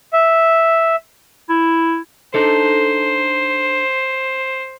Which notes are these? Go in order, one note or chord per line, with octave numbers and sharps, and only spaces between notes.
E5
E4
D4 D#4 A4 C5